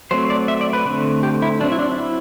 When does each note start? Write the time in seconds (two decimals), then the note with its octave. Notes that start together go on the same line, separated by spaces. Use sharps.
0.11 F#3 A3 C4 C5
0.30 D5
0.48 E5
0.61 D5
0.73 B4
0.86 D3 A3 C4
1.23 G4
1.42 E4
1.60 F#3 D4
1.63 C4
1.72 E4
1.79 D4
1.98 E4